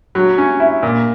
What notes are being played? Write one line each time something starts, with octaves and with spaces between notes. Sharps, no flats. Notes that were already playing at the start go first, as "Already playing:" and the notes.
F#3
C#4
E4
A#2